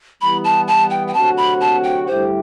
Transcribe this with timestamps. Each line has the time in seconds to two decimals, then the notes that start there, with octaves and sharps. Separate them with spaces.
0.21 E3 G3 B3 B5
0.44 A5
0.68 A5
0.90 G5
1.07 G5
1.14 D2 C3 F#3 C4 F#4 A5
1.37 B5
1.61 A5
1.84 G5
2.07 G2 D3 A3 E4 G4 C5